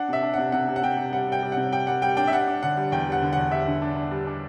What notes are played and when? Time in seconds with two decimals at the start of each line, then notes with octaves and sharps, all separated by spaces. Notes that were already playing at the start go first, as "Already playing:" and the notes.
Already playing: D4 F#5
0.09 C3 E5
0.22 D4
0.34 C3 F#5
0.52 C3 F#5
0.68 C3
0.76 F#5
0.83 C3 G5
0.97 C3
1.12 G3 F#5
1.28 G3 G5
1.43 G3
1.52 F#5
1.57 C3
1.72 G3 G5
1.87 G3 F#5
2.02 G3 G5
2.17 D4 G5
2.27 E5
2.32 G3 F#5
2.48 D4
2.63 D3 F#5
2.77 G3
2.92 E2 G5
3.07 G3
3.12 F#5
3.22 D3
3.33 E2 F#5
3.51 G3 E5
3.67 D3
3.82 D4
3.97 D4
4.11 G3
4.27 D4